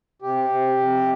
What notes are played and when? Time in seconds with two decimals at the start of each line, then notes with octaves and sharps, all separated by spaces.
0.22 C3 G4
0.49 C3
0.77 F2